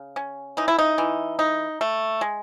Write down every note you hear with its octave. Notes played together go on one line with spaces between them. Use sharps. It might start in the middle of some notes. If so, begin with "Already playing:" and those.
Already playing: C#3
C#4
E3 D#4
E4
D#4
E3
D#4
A3
G#3